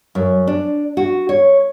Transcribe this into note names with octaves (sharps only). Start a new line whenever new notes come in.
F#2
D4
F#4
C#5